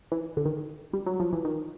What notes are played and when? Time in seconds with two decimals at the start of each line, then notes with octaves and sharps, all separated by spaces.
0.12 E3
0.37 D3
0.45 D#3
0.93 G3
1.06 F#3
1.20 F3
1.33 E3
1.45 D#3